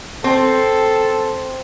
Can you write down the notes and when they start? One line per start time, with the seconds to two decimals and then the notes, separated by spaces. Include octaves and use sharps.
0.24 C4 A4